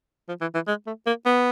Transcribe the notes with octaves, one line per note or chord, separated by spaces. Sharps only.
F3
E3
E3
G#3
A3
A#3
B3